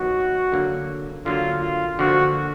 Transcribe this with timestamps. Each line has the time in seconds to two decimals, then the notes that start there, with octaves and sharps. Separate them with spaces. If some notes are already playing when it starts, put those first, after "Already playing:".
Already playing: D#3 F#3 B3 F#4
0.52 D3 F#3 A#3
1.26 D3 F#3 A#3 F4
1.62 F4
1.99 D3 F3 A#3 F#4